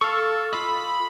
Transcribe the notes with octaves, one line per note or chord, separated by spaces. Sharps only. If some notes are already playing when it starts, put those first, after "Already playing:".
A4 F5 C#6
F4 A4 D#5 B5